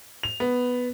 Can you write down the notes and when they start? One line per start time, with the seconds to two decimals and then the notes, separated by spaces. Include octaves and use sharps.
0.23 F7
0.40 B3